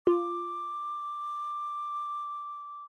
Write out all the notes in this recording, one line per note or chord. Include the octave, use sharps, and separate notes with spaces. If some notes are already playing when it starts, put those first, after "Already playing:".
F4 D6